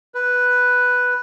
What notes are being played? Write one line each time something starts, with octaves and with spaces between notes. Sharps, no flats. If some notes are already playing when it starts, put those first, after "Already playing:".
B4